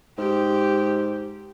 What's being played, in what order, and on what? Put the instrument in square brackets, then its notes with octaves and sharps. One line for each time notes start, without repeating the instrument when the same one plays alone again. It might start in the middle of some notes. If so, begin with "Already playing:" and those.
[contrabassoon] G#2 [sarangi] G4